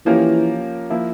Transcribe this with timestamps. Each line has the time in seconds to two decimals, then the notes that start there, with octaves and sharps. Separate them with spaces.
0.05 E3 F3 A#3 C#4 G4 A#4
0.90 F3 A#3 E4